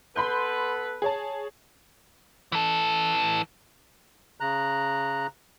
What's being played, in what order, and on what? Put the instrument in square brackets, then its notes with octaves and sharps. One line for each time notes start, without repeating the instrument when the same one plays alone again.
[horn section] B3 A4 B4 [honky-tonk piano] B5 C6 G6
[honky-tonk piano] G#4 C#5 A5
[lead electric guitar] E3 A4
[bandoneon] C#3 A#5 F#6